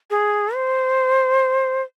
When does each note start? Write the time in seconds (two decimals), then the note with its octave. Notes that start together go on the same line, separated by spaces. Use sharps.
0.10 G#4
0.55 C5